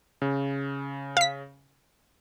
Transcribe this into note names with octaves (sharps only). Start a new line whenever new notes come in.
C#3
F5 B6